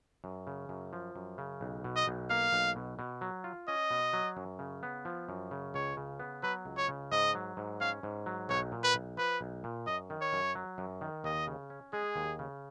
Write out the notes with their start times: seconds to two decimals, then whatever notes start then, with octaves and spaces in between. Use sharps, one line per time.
0.24 F#2
0.47 C#3
0.69 F#2
0.93 F3
1.16 F#2
1.38 C#3
1.61 B1
1.84 B2
1.96 D#5
2.07 B1
2.30 A#3 F5
2.52 B1
2.76 B2
2.99 B2
3.21 F#3
3.44 F4
3.68 C#4 D#5
3.91 B2
4.13 F#3
4.37 F#2
4.59 C#3
4.83 B3
5.05 F3
5.29 F#2
5.51 C#3
5.74 C#2 C#5
5.97 C#3
6.20 B3
6.43 F#3 B4
6.65 C#2
6.77 C#5
6.89 C#3
7.11 G#2 D#5
7.35 F#3
7.57 G#2
7.80 C#4 F5
8.03 G#2
8.26 F#3
8.49 B1 C#5
8.72 A#2
8.84 B4
8.95 B1
9.17 F3 B4
9.41 B1
9.64 A#2
9.87 F#2 D#5
10.10 D#3
10.21 C#5
10.33 F#2
10.55 F#3
10.78 F#2
11.01 D#3
11.24 D#2 D#5
11.47 C#3
11.70 C#4
11.93 G#3 G#4
12.16 D#2
12.39 C#3